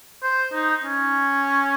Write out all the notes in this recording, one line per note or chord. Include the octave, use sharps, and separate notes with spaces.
C5
D#4
C#4